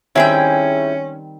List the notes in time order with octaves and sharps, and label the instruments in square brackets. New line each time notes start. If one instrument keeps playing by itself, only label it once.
[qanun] D#3 G3 C4 [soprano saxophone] C#4 [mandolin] E4 G#4 G5